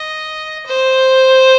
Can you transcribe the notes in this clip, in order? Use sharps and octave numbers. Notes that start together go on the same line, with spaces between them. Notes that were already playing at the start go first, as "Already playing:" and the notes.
Already playing: D#5
C5